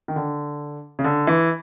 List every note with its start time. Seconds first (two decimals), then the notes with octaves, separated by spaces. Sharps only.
0.08 D#3
0.16 D3
0.99 C#3
1.04 D3
1.27 E3